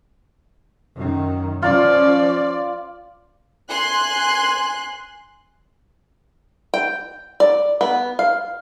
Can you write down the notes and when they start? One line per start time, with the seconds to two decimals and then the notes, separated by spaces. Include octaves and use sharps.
0.94 F#2 D#3
1.63 F3 C#4 F4 D5
3.69 G#5 C6 F#6
6.74 G5
7.40 D5
7.81 B3
8.19 F5